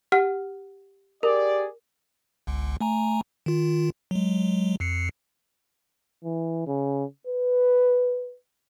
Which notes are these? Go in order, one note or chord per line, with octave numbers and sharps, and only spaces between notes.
G4 F#5 F6
G4 G#4 A#4 D5
G1 C#2
A3 G#5 A#5
D#3 F4
F#3 G#3
F2 C7 C#7
E3
C#3
B4